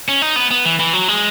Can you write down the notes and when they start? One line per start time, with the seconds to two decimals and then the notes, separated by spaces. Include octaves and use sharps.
0.08 C#4
0.22 D#4
0.36 B3
0.51 B3
0.65 E3
0.79 E3
0.93 F#3
1.08 G#3